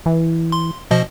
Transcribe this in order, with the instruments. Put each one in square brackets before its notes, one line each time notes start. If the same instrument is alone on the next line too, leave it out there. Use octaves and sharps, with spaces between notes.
[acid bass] E3
[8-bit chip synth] C6
B2 F3 D#5